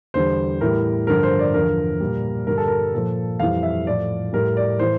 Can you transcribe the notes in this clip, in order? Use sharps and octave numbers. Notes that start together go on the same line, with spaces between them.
E2 D3 G3 C5
A2 E3 G3 A#4
G2 D3 F3 A#4
C5
D5
E2 D3 F3 A#4
A#2 G3
G2 D3 G3 A#4
A4
A#4
A#2 F3 A4
F2 E3 G3 F5
E5
A2 F3 D5
A2 G3 A#4
D5
A2 E3 C5